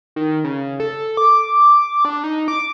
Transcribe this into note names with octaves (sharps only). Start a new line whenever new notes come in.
D#3
C#3
A4
D6
D4
D#4
D6